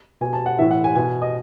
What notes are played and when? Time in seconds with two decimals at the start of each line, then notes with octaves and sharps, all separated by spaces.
0.21 B2 G#5
0.33 A5
0.46 F#5
0.59 A2 E3 E5
0.71 F#5
0.84 G#5
0.96 B2 G#5
1.22 D#5